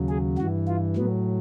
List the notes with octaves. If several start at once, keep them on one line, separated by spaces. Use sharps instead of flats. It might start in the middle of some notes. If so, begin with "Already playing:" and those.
Already playing: D#2 C#3 F#3
G#4
G2 E3 F#4
F4
A2 F#3 B3